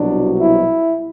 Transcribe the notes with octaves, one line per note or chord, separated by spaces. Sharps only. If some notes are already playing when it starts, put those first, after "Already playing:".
Already playing: C2 B2 F#3 D4
E4